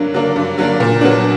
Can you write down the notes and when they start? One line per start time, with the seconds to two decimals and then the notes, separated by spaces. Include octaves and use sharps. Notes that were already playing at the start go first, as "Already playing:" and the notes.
Already playing: G2 D3 F#3 A#3 D4
0.14 D3 F#3 A#3 D4
0.36 G2
0.57 D3 F#3 A#3 D4
0.80 A#2
1.01 F#3 B3 D4